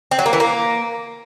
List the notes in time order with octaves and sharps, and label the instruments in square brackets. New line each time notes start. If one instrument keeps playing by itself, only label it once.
[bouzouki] C4
F#3
A#3
E3
A#3